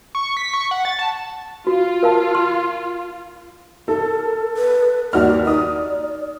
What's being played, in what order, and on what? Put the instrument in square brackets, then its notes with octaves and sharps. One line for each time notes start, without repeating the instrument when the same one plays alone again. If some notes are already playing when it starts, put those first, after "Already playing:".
[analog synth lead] C#6
B6
C#6
F#5
A6
A5
[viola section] F4 [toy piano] F#4
[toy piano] A#4 F5 A5
C6
[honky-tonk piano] A4 [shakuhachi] A#4
[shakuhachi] B4
[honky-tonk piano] D#2 F#4 F6 [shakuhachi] D5
[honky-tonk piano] D#4 D#6 [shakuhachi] D5